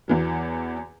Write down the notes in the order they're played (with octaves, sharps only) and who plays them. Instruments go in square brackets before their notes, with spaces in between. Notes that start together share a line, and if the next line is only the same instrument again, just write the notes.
[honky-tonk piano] E2 E3 F#3